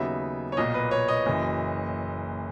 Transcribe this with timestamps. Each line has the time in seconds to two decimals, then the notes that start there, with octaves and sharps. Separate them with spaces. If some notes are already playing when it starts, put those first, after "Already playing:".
Already playing: D#2 C#3 F#3 B3 D#4 E5
0.52 C#5
0.57 B1 A#2 A#3 D#5
0.74 B4
0.91 C#5
1.08 D#5
1.26 F#1 F#2 E3